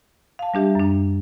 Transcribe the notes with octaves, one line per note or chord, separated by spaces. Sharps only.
F5 A5
G3 D4 G4 E5
F#2 D4